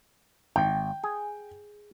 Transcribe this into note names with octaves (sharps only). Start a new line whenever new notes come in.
G#1 G5
G#4